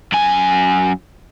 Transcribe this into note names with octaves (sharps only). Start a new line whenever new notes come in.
F#2 G#5